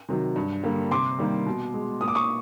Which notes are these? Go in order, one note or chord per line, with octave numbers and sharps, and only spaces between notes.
C3 D#3 F#3
G2
D3 G3 A#3
C3 C6 D6
D#3 G3 A#3
B2
G#3
A#2 D#6
D6
C#6 D#6